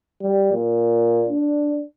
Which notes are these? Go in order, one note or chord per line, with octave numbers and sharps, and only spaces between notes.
G3
A#2
D4